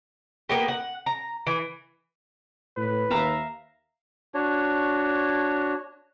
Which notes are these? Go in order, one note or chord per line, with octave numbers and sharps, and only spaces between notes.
A#3 B3 G4
F#5
A#5
E3
A2 B4
D#2 E5 F5 A#5
D4 F#4 C#5